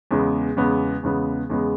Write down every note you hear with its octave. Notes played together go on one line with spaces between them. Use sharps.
E2 C#3 G#3 B3
E2 C#3 G#3 B3
E2 C#3 G#3 B3
E2 C#3 G#3 B3